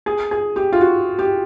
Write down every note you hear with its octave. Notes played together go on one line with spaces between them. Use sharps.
G#4
G#4
G4
F4
F#4
G4